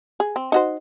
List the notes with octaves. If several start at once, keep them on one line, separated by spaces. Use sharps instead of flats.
G#4
C4
D#4 F#4 C5